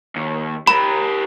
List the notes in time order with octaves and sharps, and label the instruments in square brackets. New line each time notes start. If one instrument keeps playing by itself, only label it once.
[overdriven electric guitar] D#2
[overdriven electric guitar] G4 A#4 [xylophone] B5